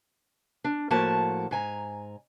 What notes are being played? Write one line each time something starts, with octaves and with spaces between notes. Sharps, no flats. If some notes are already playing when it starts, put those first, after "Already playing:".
D4
A2 F3 A#3 F#4 A5
G#2 G#5 A#5